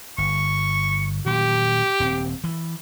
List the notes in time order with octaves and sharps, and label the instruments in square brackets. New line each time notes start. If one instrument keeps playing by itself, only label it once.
[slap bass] G1 [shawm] C#6
[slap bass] A#2 D#3 F#3 [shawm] G4
[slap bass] D#1 C4
E3